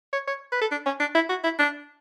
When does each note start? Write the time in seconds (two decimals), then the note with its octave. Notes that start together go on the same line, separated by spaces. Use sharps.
0.13 C#5
0.27 C#5
0.52 B4
0.61 A4
0.71 D4
0.86 C#4
1.00 D4
1.14 E4
1.29 F#4
1.44 E4
1.59 D4